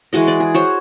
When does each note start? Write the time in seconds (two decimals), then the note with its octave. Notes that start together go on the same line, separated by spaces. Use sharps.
0.13 E3 G#3 F#4 D#5
0.28 D5
0.40 G#4
0.54 F#4 C5 C#5